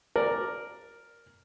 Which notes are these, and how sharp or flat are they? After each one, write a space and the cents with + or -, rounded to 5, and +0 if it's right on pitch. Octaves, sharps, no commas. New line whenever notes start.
A#4 +0 D5 +5